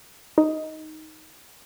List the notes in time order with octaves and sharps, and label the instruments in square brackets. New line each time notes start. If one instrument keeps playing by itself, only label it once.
[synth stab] D#4